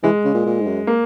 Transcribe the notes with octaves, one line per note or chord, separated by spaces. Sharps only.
E3 G#3
C#3
A#2
A#2
G#2
F#2
A#3